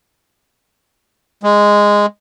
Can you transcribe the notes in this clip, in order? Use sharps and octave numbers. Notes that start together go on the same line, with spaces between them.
G#3